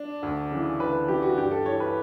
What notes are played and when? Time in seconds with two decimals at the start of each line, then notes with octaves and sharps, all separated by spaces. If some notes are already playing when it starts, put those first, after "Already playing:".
Already playing: D4
0.23 D2
0.51 C#3 E3
0.80 D2 B4
1.08 C#3 E3 G4
1.22 F#4
1.37 G2 G4
1.51 A4
1.66 E3 C#5
1.80 B4